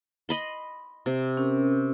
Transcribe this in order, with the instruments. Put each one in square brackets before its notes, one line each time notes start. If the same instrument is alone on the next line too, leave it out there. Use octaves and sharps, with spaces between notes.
[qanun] D#5 B5 C6
C3
[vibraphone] C#4 G4 A#4